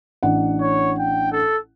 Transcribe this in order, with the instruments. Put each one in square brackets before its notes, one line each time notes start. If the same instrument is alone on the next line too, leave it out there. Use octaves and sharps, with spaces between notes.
[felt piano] A1 D4 F#5
[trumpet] C#5
G5
A4